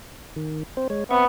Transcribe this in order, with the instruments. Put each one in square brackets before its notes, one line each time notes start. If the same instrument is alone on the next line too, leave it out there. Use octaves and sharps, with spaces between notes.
[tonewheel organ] D#3
C4 C5
G#3 C#5
[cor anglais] B3 [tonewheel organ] C4 E5 C#6